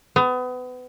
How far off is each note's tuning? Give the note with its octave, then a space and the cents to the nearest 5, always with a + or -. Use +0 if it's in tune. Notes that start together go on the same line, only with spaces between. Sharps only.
B3 +30